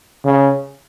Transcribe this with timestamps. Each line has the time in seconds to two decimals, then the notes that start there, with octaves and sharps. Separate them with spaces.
0.25 C#3